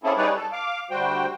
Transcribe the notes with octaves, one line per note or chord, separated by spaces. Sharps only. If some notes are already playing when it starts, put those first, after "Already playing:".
A#3 C4 C#4 E4 G#4 A4
G3 D#4 G#4 B4 C#5 D5
A4
F5 D6
D2 G3 F#4 C5 G5